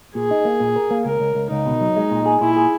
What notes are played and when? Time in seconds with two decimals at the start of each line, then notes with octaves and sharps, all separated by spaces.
0.15 A#2 G#4
0.31 D#4
0.45 A#3
0.60 A#2
0.76 A#4
0.91 A#3
1.05 C#2 A#4
1.20 C#2
1.35 C#2
1.50 C#2 D#4
1.66 B2
1.81 F#3
1.97 G#3
2.11 A#2
2.26 G#4
2.41 A#2 E4
2.56 G#4